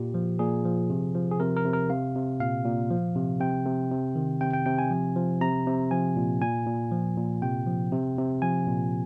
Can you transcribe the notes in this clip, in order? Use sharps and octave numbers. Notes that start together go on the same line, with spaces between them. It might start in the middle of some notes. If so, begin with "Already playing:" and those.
Already playing: A#2 G4
F3
A#2 G#4
F3
C3
F3
G#4
C3 A#4
A#4
C3
A#4
C3 F5
C3
A#2 F5
A#2
F3
C3
C3 G5
C3
C3
D#3
C3 G5
G5
C3 G5
G#5
F3
F3
C3 A#5
C3
F3 G#5
A#2
A#2 G#5
A#2
F3
A#2
C3 G5
F3
C3
C3
F3 G#5
A#2